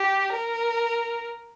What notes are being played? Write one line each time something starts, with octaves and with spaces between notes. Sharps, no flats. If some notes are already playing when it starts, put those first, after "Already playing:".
Already playing: G4
A#4